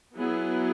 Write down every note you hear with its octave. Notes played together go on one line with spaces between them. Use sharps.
F#3 B3 E4 G#4